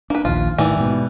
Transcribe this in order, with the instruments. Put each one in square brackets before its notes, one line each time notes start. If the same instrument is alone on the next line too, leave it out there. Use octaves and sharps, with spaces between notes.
[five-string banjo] A#3 B4 [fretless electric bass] D4
[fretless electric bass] A#1 D#2 [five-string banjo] F4
[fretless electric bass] A2 D#3 [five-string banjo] E3 G3
[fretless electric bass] G#2 B2